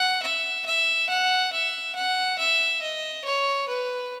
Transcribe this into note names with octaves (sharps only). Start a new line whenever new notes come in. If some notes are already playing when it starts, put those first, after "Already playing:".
Already playing: F#5
E5
E5
F#5
E5
F#5
E5
D#5
C#5
B4